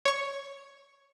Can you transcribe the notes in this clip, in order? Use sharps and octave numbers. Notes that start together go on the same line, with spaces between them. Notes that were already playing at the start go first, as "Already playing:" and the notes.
C#5 C#6